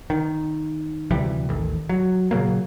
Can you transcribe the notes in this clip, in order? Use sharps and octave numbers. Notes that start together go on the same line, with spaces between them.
D#3
D2 C3 E3 G3
A1 D#2
F#3
A#2 C#3 F#3 A#3